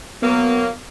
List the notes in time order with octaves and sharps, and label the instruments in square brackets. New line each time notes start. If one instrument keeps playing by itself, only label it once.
[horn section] F#3 A#3 [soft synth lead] B3